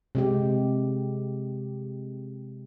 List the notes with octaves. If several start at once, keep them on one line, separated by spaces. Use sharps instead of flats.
C3 G#3 G4